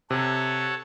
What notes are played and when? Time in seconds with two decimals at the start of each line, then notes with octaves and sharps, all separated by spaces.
0.10 C3 A4 C#5 F#5